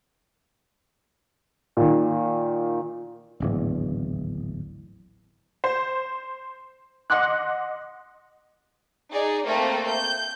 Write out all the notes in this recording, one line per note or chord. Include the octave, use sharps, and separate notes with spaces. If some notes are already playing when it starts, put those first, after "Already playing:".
A#2 D#3
D1 G#1 E2
C5
D#5 F#5 C6 D6 F#6
D#4 G#4 D5
A3 A#3 C4 A4
G6